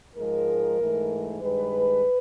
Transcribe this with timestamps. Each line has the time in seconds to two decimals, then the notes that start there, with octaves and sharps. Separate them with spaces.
0.16 G#2 F3 G#3 A#4
0.79 G#2 E3 A3
1.42 G2 D#3 G#3 B4